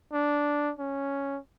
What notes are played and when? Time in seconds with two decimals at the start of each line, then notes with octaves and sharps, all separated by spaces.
0.13 D4
0.79 C#4